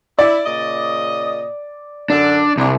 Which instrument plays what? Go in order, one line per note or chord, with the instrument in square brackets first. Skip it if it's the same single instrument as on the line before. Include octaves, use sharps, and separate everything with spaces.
[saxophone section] E4 [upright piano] D5
[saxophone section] A#2 C#3 D#5
[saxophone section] F#2 D3 [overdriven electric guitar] D4
[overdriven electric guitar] C2 [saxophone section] D4